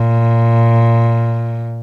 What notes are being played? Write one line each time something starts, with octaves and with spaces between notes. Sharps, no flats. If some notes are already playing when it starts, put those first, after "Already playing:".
Already playing: A#2